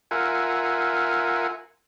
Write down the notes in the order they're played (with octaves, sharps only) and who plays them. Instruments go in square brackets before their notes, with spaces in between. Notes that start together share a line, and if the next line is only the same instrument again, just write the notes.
[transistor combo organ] F4 A#4 E5 F#5 G#5